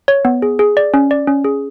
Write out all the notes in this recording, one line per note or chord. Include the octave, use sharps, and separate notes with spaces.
C#5
B3
G#4
G#4
D5
C#4
D5
C#4
G#4